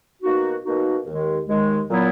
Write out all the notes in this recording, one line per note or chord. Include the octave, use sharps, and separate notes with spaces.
B2 A#3 D#4 F#4
B2 A#3 D#4 F#4
D#2 D#3 G#3
D#2 D#3 G#3
A#2 F#3 B3 E4